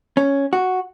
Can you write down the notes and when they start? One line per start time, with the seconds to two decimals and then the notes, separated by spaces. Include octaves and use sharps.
0.17 C#4
0.53 F#4